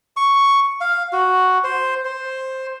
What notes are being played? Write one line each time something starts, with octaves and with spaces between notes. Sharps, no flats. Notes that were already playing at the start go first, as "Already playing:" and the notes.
C#6
F5
F#4
C5
C5